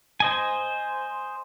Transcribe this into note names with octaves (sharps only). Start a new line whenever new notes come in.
C5 D#5 G#5